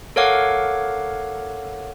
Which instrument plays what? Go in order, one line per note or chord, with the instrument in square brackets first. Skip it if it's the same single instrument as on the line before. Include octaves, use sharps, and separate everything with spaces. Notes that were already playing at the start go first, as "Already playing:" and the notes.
[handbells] A4 A#4 C#5 F5 F#5 D6